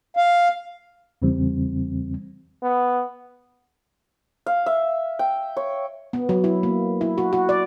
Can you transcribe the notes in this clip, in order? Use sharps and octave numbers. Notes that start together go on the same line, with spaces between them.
F5
E2 C#3 E3 G3 C4
B3
F5
E5
G5
C#5
B3
F#3
E4
A#3
E4
F#4
F#4
D5